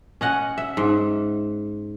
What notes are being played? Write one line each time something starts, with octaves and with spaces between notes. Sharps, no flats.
C#4 D#5 F#5
E5
G#2